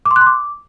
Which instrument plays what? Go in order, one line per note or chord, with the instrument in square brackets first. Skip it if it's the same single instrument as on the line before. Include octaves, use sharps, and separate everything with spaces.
[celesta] D6
C6
F#6
C6
D6